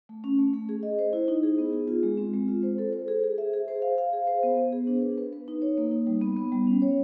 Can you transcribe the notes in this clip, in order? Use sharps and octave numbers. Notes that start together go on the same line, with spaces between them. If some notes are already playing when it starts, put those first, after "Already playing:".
A3
C#4
A3
A3
G#4
D#5
C5
E4
D#4
G#4
B3
G#4
F4
G#3
C4
G#3
F4
C5
A4
C5
G#4
G#4
E5
G#4
C5
F5
F5
G#4
C5
B3
B3
G#4
D4
B4
B4
B4
D#4
C#5
A#3
D#4
G3
B3
B3
G3
C#4
C#5